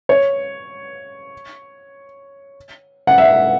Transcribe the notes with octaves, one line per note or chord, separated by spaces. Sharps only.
C#5
F#5
E5